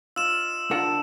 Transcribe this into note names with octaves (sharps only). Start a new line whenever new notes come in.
F4 D#5 E6 E7
D3 F4 A#4 F#5 A5